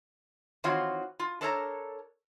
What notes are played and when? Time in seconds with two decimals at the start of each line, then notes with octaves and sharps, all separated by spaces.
0.64 D#3 E3 C4 F4 F#4 C#5
1.20 F4
1.41 D4 A4 A#4 C#5 G5 A#5